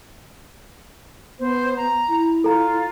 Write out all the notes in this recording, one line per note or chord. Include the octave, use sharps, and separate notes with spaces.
B3 C5
A#5
E4
F4 A4 A#5